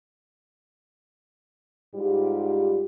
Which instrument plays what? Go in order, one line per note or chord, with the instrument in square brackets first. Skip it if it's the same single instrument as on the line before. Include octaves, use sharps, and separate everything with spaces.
[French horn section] G#2 G3 F4 G4